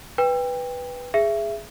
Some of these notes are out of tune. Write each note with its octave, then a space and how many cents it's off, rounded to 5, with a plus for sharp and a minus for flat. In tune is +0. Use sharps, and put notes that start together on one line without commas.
B4 +0 G5 +25
G#4 +0 E5 +20